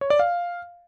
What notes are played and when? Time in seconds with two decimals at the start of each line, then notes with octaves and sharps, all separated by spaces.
0.01 C#5
0.10 D5
0.19 F5